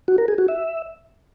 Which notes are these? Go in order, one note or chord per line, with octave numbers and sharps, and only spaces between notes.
F#4
A#4
G#4
F#4
E5